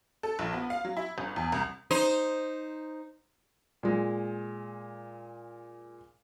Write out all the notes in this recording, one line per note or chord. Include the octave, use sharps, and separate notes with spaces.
A4
A#1
B3
F5
F#3
E4
G1
E2
C2
D#4 C5
A#2 G#3